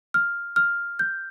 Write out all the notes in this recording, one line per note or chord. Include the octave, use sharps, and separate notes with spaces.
F6
F6
G6